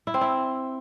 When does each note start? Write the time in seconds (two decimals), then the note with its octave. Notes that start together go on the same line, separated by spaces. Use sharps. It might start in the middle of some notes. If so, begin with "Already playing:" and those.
0.07 E4
0.14 C4
0.21 E4